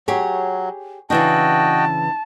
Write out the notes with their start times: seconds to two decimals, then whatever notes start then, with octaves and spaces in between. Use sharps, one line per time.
0.08 F#3 G4 G#4 C#5
1.10 C#3 E3 D4 F#4 D#5 G5 A5